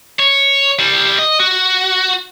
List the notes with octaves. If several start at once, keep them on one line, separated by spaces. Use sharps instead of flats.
C#5
G3 E4
D#5
F#4